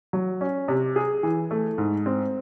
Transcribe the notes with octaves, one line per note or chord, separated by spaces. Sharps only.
F#3
C#4
C3
G#4
E3
A3
G#2
C4